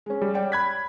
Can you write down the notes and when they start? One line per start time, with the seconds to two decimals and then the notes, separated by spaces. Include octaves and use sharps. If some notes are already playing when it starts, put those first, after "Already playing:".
0.06 G#3 C#4
0.22 G3
0.34 C#5 D5 G5
0.52 B5 F#6 G#6 B6